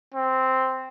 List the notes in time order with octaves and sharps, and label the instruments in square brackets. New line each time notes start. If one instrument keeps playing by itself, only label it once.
[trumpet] C4